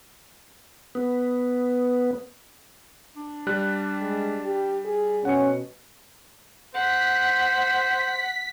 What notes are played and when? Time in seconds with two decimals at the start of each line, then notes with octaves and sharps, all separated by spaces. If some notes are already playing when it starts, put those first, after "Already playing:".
0.95 B3
3.16 D4
3.47 G3 F#6
4.00 G#3
4.45 G4
4.85 G#4
5.25 B2 C#4 F#5 C#7
6.75 C5 F#5 B6